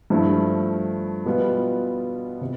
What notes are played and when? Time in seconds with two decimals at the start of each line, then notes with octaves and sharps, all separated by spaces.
0.10 G2 F3 A3 E4
1.25 B2 G3 B3 F4 B4
2.41 C3